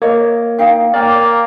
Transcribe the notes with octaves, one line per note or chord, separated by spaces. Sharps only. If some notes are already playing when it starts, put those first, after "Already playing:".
A#3 C#5 D#5
D#4 F5 G5
A#3 C#5 D5 G5